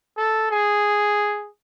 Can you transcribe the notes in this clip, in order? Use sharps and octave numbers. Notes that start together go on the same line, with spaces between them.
A4
G#4